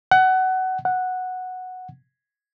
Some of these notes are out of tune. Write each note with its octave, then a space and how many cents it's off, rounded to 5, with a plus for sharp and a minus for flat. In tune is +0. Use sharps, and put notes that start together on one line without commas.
F#5 +20
F#5 -5